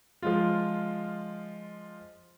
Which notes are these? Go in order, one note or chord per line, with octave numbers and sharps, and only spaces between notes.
F3 G#3 F4